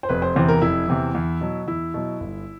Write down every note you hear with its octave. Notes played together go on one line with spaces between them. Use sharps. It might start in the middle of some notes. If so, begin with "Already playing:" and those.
C5
F1 B4
C5
E2 C3 E3 C5
A#4
F1 E4
E2 C3 E3
E2
B2 F#3
E2 E4
B2 F#3
G1